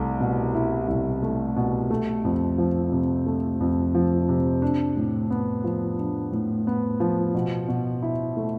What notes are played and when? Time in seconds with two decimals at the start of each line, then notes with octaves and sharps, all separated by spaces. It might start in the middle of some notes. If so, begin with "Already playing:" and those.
Already playing: C2 A3
0.20 B2
0.55 E4
0.88 C2
1.23 A3
1.56 B2
1.91 A3
2.25 F2
2.58 F3
2.92 C3
3.27 A3
3.60 F2
3.95 F3
4.29 C3
4.62 D4
4.97 A2
5.31 B3
5.64 F3
5.99 D4
6.32 A2
6.67 B3
7.00 F3
7.34 B2
7.68 B2
8.02 E4
8.37 A3